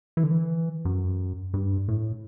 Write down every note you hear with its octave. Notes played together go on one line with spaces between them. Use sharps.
E3
D3
E3
F#2
G2
A2